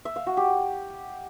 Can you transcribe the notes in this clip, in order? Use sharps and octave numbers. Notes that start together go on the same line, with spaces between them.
E5
F5
F#4
G4